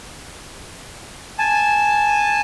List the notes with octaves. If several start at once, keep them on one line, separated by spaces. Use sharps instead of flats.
G#5 A5